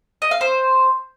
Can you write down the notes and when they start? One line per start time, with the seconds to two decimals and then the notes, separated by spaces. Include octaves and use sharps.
0.22 D#5
0.31 F5
0.41 C5